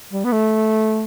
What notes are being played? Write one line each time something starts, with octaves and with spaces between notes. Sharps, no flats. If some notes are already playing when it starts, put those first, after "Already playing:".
G3
B3
A3